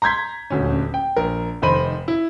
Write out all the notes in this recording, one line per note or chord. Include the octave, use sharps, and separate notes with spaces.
A#5 C6 G6 G#6 B6
D#1 D2 C#4
G5
A#1 A#4
F1 D#3 C5 B5 D#7
E4